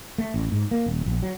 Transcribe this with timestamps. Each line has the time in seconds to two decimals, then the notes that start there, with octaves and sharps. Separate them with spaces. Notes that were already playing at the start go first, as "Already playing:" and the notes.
0.18 A3
0.34 A1
0.52 G#2
0.71 A#3
0.86 D#1
1.06 A#1
1.23 F#3